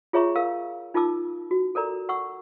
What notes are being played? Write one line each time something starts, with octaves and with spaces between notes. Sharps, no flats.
F4 G#4 C#5 E5 A#5 C#6
A#4 F5 E6
D#4 F4 A#4 A5 D6 E6
F#4
A4 A#4 D5 A#5
F#5 C#6 E6